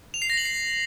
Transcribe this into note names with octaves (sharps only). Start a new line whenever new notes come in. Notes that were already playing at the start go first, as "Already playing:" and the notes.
F7
C7
A#6
F#7
C7